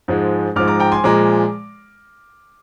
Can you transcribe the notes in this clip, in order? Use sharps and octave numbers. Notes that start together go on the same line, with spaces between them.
G#2 F3 G#3
G#2 F3 G#3 D6 F6
A#5 D6
G5 A#5
G#5 C6
A#2 F3 G#3 A#5 D6